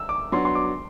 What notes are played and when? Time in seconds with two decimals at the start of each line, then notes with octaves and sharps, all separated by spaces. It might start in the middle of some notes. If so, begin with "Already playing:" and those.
Already playing: E6
0.09 D6
0.32 F#3 B3 D4 F#4 C6
0.45 C6
0.55 D6